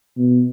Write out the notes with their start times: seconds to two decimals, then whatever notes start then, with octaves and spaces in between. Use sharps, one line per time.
0.17 B2